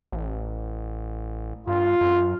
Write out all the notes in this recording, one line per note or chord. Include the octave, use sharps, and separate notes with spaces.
A1
G2 F4
F#2